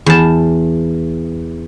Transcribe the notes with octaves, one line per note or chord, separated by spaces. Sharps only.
E2 A5